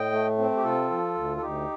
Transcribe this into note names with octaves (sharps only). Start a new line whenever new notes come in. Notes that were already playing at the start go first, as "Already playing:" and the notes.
Already playing: A2 D#5 G5
A3
C4
G4
C3 F4 A4
F3
D2
A4
D2 D#4 G4